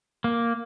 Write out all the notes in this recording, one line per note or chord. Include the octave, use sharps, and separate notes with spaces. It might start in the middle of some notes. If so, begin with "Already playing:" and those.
A#3